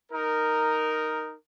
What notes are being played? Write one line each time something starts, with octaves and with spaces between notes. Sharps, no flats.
D#4 A#4